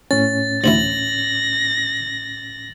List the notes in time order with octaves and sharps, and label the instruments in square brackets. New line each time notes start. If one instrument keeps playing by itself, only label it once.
[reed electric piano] A2 C#4 [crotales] A6
[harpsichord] A1 D2 E4 [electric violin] A#6 [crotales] F#7